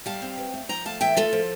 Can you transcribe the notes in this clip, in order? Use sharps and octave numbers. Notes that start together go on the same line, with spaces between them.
G3 F5 A5
C4
E3
A3
F3 G5 A#5
A3 F5 A5
E3 E5 G5
A3 F4 A4
F3